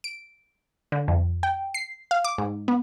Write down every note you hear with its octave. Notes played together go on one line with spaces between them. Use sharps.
D7
D3
F2
G5
C7
F5
D6
G#2
B3